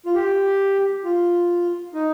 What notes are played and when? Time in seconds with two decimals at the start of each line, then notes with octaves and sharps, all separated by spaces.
0.06 F4
0.15 G4
1.04 F4
1.94 D#4